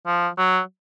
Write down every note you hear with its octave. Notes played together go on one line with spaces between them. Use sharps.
F3
F#3